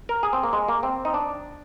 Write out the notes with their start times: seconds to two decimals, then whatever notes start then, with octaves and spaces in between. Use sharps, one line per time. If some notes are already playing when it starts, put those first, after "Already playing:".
0.09 A#4
0.23 G#4
0.33 C4
0.43 A#3
0.53 G#3
0.68 A#3
0.83 C4
1.05 D#4
1.14 D4